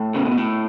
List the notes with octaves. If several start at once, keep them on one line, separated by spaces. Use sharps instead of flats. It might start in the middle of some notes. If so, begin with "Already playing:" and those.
Already playing: A2
C#3
B2
A2